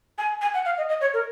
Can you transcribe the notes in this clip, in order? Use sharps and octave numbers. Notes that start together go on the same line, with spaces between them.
G#5
G#5
F#5
F5
D#5
D#5
C#5
A#4